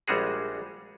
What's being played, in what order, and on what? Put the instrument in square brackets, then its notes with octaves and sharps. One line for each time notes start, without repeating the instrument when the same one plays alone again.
[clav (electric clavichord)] A#1 G3 G#3 F#4 G#4